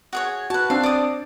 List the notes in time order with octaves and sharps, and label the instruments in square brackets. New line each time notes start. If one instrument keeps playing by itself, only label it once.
[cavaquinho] F#4 G#4 C#5
[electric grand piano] F#4 [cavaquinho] B4 A5
[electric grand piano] C4 D4 [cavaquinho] F5
[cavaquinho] D5 D#6